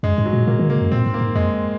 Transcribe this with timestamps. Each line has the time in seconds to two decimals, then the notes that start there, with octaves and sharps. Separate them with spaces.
0.03 F#2 G#3
0.18 G#2
0.26 F#3
0.33 A#2
0.47 A#2 A#3
0.59 D#3
0.69 C#3 A#3
0.80 F#2
0.92 A#2 C4
1.06 G#2
1.14 A#3
1.21 G#2
1.35 F2 G#3